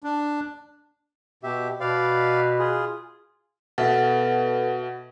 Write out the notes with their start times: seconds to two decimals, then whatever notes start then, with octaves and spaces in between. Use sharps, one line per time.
0.04 D4
1.43 B2 G4 E5
1.80 B2 B4 D5 F5
2.59 F4 G#4
3.78 B2 B3 A4 B4 E5 F#5